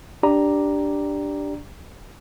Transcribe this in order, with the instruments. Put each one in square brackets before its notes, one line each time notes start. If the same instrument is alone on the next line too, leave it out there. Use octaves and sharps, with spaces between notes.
[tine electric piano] D4 G4 D5 A#5